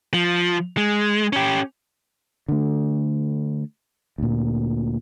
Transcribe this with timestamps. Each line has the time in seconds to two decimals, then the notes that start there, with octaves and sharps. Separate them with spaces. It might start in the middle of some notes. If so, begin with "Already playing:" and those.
0.14 F3
0.77 G#3
1.33 C#4 G4
2.48 D3 A3
4.18 D2 A#2